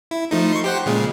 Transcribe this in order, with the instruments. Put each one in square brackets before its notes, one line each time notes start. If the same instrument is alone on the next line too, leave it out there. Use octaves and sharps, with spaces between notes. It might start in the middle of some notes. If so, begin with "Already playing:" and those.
[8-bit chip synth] E4
F3 A3 D#4
C6 C#6
G4 C5 F#5
A#2 C#3 G#3